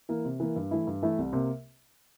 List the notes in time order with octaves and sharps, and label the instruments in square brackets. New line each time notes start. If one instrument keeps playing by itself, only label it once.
[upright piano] E3 A#3
C3
E3 A#3
G2
E3 A3 E4
G2
E3 A3 E4
C2
C3 A#3